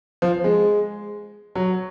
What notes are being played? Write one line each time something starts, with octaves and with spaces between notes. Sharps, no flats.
F3
G#3
F#3